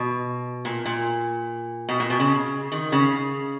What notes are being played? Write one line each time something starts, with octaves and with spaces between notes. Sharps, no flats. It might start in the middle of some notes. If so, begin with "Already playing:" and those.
Already playing: B2
A#2
A#2
B2
A#2
B2
C#3
D#3
C#3